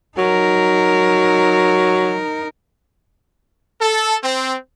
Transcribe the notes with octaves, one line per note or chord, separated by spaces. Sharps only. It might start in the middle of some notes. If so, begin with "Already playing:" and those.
F#3 D#4 A#4
A4
C4